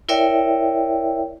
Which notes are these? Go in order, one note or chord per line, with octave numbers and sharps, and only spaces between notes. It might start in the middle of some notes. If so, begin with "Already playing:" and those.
E4 A#4 C#5 D5 E5 G5